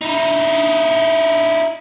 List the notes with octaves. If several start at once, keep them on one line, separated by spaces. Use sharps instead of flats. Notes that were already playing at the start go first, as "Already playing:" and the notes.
D#4 E4